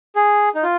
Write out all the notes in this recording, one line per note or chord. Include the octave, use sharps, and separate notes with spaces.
G#4
D#4
F4